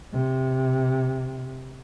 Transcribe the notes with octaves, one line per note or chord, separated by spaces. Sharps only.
C3